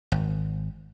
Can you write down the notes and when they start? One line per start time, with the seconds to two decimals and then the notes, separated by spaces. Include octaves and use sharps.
0.12 G#1